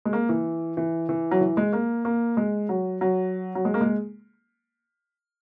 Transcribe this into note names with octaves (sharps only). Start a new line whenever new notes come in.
G#3
A#3
E3
E3
E3
F#3
E3
G#3
A#3
A#3
G#3
F#3
F#3
F#3
G#3
A#3
G#3